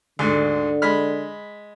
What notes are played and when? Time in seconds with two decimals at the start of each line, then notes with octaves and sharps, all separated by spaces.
0.19 D2 G#2 D3
0.82 G#3 B5 F6